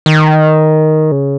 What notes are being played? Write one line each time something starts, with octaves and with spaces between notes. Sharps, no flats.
D#3
C#3